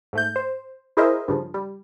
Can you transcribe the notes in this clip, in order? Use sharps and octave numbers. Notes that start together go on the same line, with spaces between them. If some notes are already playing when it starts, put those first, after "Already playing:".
G#2 A3 G6
C5
E4 G#4 A#4 C5 D#5 E5
G2 C#3 F3
G3